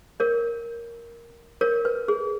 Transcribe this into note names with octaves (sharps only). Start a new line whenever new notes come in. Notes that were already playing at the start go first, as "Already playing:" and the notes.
A#4 C#5
A#4 C#5
B4
G#4